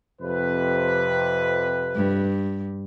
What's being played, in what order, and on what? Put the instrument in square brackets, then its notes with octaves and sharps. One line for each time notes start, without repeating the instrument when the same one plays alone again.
[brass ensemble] F2 C3 B4
[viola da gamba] G2